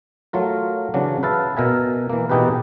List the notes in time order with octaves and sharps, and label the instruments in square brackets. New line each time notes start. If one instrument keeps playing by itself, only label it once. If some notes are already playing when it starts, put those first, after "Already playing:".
[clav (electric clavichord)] F#3 A3 F4 A#4
C#3 E3 F#3 D4
B4 E5 F5 A5
B2 A#4 E5 G#5
E3 A#3
B2 E3 D#4 G4 G#4 B4